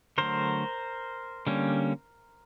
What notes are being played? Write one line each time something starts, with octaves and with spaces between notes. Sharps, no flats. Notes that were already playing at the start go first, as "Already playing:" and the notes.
D3 F#3 A3 A#4 C5
D3 G3 A#3 C#4